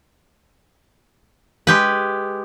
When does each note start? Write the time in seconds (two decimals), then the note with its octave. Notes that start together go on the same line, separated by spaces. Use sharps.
1.67 G#3 G4 B4